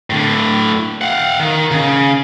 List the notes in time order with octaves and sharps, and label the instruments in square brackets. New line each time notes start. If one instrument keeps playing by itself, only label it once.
[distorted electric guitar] A2 D3
F5 F#5
D#3
C#3